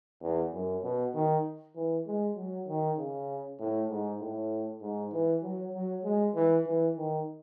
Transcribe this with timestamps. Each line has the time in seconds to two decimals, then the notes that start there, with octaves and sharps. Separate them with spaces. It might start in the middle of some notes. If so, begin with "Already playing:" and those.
0.22 E2
0.53 F#2
0.83 B2
1.14 D#3
1.75 E3
2.07 G#3
2.36 F#3
2.68 D#3
2.98 C#3
3.60 A2
3.90 G#2
4.20 A2
4.81 G#2
5.13 E3
5.43 F#3
5.74 F#3
6.04 G#3
6.34 E3
6.66 E3
6.97 D#3